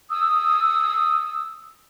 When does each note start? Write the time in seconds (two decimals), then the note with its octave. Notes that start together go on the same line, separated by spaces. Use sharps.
0.10 D#6 E6